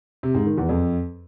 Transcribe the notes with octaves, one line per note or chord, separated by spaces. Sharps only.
C3
G#2
D#3
E2
F2